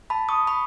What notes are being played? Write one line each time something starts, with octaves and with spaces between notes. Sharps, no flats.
A5 B5
C#6 D#6
B5 C#6